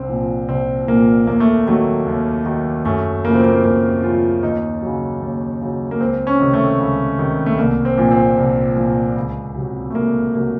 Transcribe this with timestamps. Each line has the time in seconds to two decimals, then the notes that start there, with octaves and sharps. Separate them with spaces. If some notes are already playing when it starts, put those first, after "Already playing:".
Already playing: C2 C4
0.09 A#2 F3
0.49 C2 C4
0.88 A#2 F3 A#3
1.27 D#2 A#3
1.40 A3
1.67 D#3 F#3 A3
2.06 D#2
2.45 D#3 F#3
2.85 F#2 A3
3.24 C#3 F3 A#3
3.35 C4
3.45 A#3
3.64 F#2 A#3
4.03 C#3 F3 F4
4.43 D#2 D#4
4.82 C#3 F#3
5.22 D#2
5.61 C#3 F#3
5.91 A#3
6.01 C#2 C4
6.27 C#4
6.40 C3 D#3
6.54 A3
6.80 C#2
7.19 C3 D#3
7.46 A3
7.58 C2 A#3
7.85 C4
7.98 A#2 F3
8.11 C4
8.37 C2
8.77 A#2 F3
9.16 C#2
9.55 C3 F#3
9.90 A3
9.95 C#2 A#3
10.35 C3 F#3 A#3